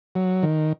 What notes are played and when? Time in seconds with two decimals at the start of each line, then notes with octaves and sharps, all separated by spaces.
0.15 F#3
0.43 D#3